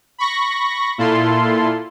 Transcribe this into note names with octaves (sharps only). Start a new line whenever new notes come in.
B5 C#6 A#6
A#2 E4 F4 A4 C6